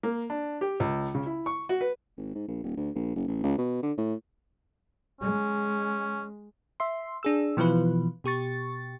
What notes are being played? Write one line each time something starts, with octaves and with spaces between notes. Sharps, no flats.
A#3
D4
G4
C#2
C#3
E4
C#6
F#4
B4
G#1
G#2
A#1
D#1
D2
A#1
F#1
A1
C#2
B2
D3
A2
G#3 C#4
E5 C6
D4 G#4 E6
B2 E3 F3 F4 B4
B2 G4 C#6 A6